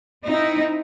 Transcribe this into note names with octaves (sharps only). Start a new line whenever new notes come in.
C4 D#4 E4